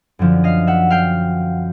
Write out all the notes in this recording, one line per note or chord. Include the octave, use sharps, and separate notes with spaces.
F#2 D3 F3
D#5 F5
E5 F#5
F5 G5